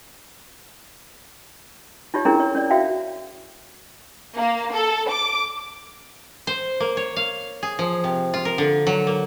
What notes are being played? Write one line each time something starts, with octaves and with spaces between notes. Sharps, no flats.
D#4 F4 G4 C#5
C#4 D4 E4 G#4 A#4 A#5
C#5
C#4 C#5 D5
F#4 E5 F5 G5
A#3
A4
D6
C5
A#3
C#5
F5
G#4
F3
C3
F4
A#4
D3
F#3
A#3